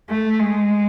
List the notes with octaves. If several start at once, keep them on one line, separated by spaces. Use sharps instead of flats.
A3
G#3